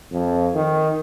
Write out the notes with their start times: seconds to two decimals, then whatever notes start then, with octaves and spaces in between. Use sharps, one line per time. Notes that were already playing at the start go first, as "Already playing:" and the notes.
0.12 F2
0.55 D#3